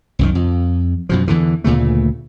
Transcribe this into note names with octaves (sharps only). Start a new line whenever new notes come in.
C2 F#2 D#3
F2
F#2 B2 F3
E2 D3 E3
D2 A#2 C#3 A3